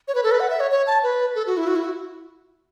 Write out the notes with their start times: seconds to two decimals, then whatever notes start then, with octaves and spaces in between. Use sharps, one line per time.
0.08 C#5
0.15 B4
0.24 A4
0.31 B4
0.40 F#5
0.50 E5
0.60 C#5
0.71 C#5
0.87 A5
1.03 B4
1.35 A4
1.47 F#4
1.57 E4
1.67 F#4
1.76 E4
1.84 F#4